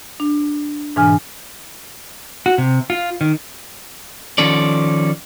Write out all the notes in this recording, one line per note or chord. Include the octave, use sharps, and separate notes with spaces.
D4
G#2 B2 E3 D4 G#5 F6
F#4
C3
F4
D#3
D#3 F3 C#4 A4 D5